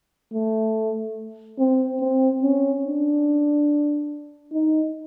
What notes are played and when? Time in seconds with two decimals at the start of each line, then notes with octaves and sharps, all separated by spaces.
0.34 A3
1.59 C4
2.01 C4
2.42 C#4
2.85 D4
4.53 D#4